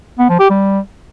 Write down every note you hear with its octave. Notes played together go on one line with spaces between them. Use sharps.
B3
F3
G4
G3